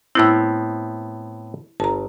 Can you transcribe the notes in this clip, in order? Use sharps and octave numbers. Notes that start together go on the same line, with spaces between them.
A2 B3 C4 E4 E6
G1 A5 A#5